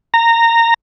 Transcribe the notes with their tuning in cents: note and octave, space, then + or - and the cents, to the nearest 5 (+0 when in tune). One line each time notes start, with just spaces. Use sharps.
A#5 -15